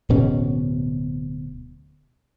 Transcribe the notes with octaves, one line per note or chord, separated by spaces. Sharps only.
D1 B2 C#4